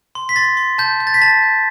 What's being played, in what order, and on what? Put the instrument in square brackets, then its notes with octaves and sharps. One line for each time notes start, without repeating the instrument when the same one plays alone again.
[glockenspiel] C6
B6
C6 A6
C6
A5 G6
G6
A6
B6
A5 A6
G6